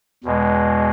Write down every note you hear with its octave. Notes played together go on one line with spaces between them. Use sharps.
E2 B2 G#3